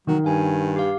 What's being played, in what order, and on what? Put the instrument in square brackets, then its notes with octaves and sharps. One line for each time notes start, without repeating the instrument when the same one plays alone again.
[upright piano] D#3 [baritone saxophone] F#3
[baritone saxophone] G2 [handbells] F5 G#5
[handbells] G4 F5